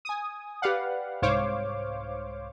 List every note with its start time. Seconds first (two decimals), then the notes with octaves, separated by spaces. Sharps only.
0.05 G#5 D#6
0.62 G4 B4 D5 F5 F#5
1.22 C2 G#2 C5 C#5 F5 D6